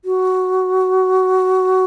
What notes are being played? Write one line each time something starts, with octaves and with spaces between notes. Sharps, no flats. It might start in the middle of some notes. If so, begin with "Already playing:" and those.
F#4